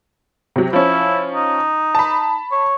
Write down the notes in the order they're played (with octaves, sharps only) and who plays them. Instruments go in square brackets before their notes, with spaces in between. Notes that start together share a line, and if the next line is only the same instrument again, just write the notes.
[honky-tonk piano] C3 F#3
[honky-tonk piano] F3 C#4 [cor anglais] E4
[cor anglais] D#4
[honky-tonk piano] A5 B5
[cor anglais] C#5